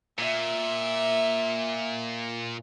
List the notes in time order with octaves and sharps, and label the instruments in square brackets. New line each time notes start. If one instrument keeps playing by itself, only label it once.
[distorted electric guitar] A#2 [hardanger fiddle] E5